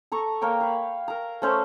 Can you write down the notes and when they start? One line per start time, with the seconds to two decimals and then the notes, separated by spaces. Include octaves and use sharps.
0.12 A4 A#5 C#6
0.41 A#3 A#4 C#5 G5
0.61 F5 B5
1.08 A#4 A#5
1.42 A3 C#4 C5